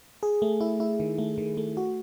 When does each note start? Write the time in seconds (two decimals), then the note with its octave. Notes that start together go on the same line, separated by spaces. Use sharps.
0.23 G#4
0.42 A3
0.61 E4
0.80 E4
1.00 D#3
1.18 A3
1.38 D#3
1.57 A3
1.77 F#4